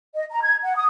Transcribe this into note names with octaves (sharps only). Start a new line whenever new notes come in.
D#5
A#5
G#6
F#5
D#6